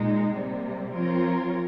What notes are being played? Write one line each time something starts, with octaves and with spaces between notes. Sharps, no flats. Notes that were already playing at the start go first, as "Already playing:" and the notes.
Already playing: A#2 G#3 D#4
C3 G3 A#3
F3 C4 F4 A#4 C#5